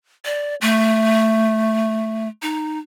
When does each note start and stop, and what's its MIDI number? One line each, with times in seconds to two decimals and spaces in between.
0.25 0.55 74
0.61 2.28 57
2.42 2.79 63